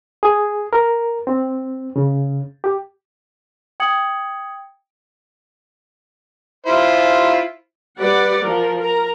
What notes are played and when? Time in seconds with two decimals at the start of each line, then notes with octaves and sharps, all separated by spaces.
0.23 G#4
0.73 A#4
1.27 C4
1.96 C#3
2.64 G4
3.80 G5 D#6 G#6 C#7 F#7
6.66 E4 F4 C5
7.98 G3 B4 D5 F#5
8.41 F3 A#4
8.80 A#4 A#5